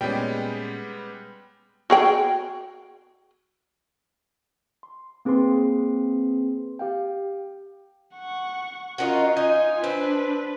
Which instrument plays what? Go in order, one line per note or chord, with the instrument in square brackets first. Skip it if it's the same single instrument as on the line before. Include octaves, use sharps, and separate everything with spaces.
[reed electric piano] A#2 C#4 [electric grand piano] G3 G#3 B3 [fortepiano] G5
[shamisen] F#4 G#4 G5
[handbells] C6
A#3 C4 G#4 B4 C6
G4 F5 G5
[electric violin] F#5 C#6
[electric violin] C#4 F4 [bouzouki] F#4 A#4 D#5
[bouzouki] D#4 [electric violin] F4 G#5
[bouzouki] C4 [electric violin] D4 B4